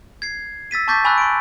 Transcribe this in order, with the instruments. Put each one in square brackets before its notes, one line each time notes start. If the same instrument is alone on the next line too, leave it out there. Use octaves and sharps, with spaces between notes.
[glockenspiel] G#6 C7
E6 A6 B6 D#7
A5 C#6 D6 G6 A6 B6
G#5 B5 C#6 E6 F#6
C6 D7